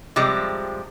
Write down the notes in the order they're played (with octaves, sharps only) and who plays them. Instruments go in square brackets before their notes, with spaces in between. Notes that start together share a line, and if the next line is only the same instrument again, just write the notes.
[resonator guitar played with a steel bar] C3 F3 G3 G#3